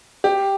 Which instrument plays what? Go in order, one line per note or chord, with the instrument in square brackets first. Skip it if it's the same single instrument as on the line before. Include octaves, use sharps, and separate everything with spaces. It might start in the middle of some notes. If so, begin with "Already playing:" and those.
[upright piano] G4